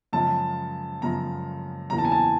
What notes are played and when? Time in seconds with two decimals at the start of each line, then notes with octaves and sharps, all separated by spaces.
0.13 F#2 C#3 F3 G#3 A5
1.02 F#2 C#3 F3 G#3 A#5
1.90 E2 C#3 F#3 A#3 A#5
1.98 A5
2.05 G#5
2.12 A5